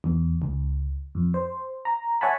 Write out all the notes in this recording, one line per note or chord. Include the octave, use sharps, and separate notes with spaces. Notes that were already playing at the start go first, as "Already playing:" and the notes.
E2
C#2
F2
C5
A#5
C#5 E5 F#5 G#5 A5 B5